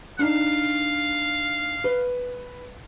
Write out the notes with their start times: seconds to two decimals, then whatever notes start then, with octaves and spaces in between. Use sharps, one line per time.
0.19 D4 D#4 F5
1.84 B4